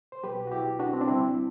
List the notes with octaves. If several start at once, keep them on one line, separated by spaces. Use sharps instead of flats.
C5
C2 B2 F#3 G4 B4
F#4
E4 G4
D4 F#4
C4
D4
D2 C3 G3 C4 E4